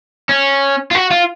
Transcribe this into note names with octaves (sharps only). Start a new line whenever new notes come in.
C#4
F4
F#4
F4